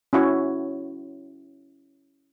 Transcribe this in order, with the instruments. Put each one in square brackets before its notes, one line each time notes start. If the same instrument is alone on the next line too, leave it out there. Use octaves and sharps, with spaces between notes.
[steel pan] C#4 E4 F#4 C#5